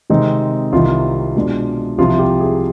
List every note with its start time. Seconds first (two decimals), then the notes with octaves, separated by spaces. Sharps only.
0.10 C3 D#3 G#3 C4 D#4
0.73 C2 C3 D#3 F4
1.35 B2 G#3 D4
1.98 C2 C3 F3 F4
2.19 G4
2.40 G#4